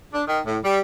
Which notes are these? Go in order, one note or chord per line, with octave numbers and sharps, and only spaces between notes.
D4
D#3
A2
G3